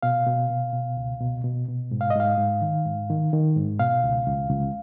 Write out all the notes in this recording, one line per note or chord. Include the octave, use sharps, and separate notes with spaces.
B2 F5
B2
B2
B2
C#2
B2
B2
B2
G#2
F5
D#5
G#2 F5
G#2
D#3
G#2
D#3
D#3
G#2
B2 F5
C#2
C#2
C#2